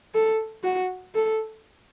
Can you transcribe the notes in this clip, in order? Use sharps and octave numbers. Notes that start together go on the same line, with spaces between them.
A4
F#4
A4